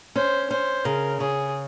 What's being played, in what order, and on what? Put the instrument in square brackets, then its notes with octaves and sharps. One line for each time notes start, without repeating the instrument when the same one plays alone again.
[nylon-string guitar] C#4 [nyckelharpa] C5
[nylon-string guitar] C#4 [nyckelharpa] C5
[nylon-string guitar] C#3 [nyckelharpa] A#4
[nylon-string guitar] C#3 [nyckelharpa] G#4